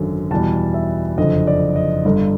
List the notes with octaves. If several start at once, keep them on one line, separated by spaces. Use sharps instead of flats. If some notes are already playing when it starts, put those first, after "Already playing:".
Already playing: G#1 F#2 D3
E2 B2 G3 A5
E5
F#1 F2 D3 D#5
D5
D#5
G1 G2 D3